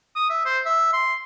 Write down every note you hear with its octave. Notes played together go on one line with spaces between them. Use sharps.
D#6
E5
C5
E5
C6